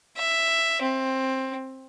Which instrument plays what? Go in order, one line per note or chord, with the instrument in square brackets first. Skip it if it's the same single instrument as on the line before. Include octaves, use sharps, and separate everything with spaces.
[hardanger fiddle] E5
C4